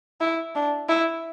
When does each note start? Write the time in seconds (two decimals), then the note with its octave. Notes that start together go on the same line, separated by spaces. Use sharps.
0.21 E4
0.55 D4
0.89 E4